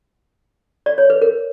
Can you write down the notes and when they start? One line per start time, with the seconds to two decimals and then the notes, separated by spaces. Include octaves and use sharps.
0.86 D5
0.98 C#5
1.10 B4
1.22 A#4